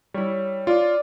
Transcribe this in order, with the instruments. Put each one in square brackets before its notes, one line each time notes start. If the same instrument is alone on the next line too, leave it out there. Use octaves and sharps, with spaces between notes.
[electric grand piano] G3 [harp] E4 C#5
[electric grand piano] F4 [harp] D5